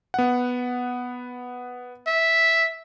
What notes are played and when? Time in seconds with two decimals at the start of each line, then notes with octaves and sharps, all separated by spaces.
0.14 B3 F#5
2.07 E5